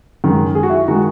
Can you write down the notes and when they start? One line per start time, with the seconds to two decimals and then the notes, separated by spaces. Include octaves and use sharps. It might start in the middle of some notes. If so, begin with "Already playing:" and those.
0.24 F#2 D#3 G#3
0.55 G#4
0.63 F#4
0.70 E4
0.77 F#4
0.88 D#3 G#3 F#4